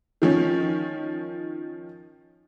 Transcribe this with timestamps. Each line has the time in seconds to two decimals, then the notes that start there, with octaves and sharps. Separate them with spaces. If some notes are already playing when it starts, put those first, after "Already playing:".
0.22 D#3 F3 C#4